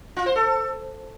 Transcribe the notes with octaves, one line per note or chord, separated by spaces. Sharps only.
F4
C5
A4